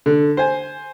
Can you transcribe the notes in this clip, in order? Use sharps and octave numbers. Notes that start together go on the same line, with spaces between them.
D3
C5 G#5